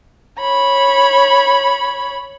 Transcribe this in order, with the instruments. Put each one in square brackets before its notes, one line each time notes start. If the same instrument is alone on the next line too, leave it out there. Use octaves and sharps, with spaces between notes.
[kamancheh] C#5 B5